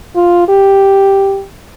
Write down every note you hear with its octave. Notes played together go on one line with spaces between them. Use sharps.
F4
G4